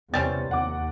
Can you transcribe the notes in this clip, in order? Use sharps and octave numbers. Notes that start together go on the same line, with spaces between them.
E2 C3 G3 C4 C#4 A6
D#2 F#5 D6